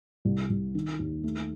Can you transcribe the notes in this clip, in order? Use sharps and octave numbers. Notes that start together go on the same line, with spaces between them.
C2
C2
D#3
D#2
A3